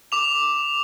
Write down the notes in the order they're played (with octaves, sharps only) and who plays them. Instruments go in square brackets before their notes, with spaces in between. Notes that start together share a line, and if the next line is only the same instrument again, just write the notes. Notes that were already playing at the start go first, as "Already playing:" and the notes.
[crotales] D6 F7